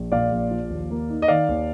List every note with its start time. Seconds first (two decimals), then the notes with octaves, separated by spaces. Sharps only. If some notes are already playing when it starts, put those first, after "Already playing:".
Already playing: A#1
0.12 A#2 D5 F5
0.31 A#1
0.51 F3
0.70 D#2
0.90 A#3
1.09 D#4
1.22 D#5
1.28 D#3 D5 F5
1.49 D#2